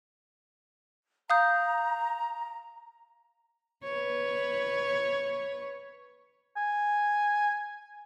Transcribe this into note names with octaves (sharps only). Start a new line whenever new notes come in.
F5 A#5 D#6 G6
B4 C#5
G#5